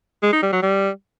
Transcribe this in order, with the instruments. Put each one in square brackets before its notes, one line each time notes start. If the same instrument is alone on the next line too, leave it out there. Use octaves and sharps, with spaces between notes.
[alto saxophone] G#3
D#4
G3
F#3
G3